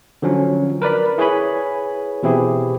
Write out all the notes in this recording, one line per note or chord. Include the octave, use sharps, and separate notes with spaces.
D3 F3 F#3 C#4
A#4 B4 D5 B5
E4 G#4 B4 C#5 G#5 B5
B2 E3 C4 E4 G4 G#4